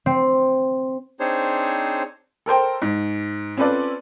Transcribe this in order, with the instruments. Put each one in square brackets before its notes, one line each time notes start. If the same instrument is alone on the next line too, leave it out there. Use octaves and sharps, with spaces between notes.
[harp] C4
[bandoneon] C4 D4 D#4 G#4 C5 C#5
[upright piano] A4 A#4 C5 G5
G#2
C4 C#4 F4 A4 B4 D5